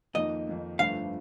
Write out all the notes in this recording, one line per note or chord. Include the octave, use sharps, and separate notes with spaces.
F2 D#3 A#3 D#4 D#5
F2 D#3 A#3 D#4
G1 G2 D3 F3 A3 F5